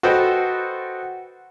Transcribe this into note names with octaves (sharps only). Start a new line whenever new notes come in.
F#4 A4 B4 C5 D#5 G5